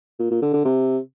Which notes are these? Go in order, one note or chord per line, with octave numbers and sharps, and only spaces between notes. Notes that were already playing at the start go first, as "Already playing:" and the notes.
A#2
A#2
D3
D3
C3